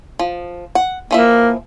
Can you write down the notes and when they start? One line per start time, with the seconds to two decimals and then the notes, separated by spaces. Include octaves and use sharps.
0.19 F3
0.75 F#5
1.11 E3 F3 A#3 E5